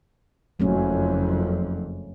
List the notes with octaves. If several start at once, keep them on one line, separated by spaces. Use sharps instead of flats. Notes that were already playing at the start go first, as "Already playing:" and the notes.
F#1 F2 F#3 A3 C#4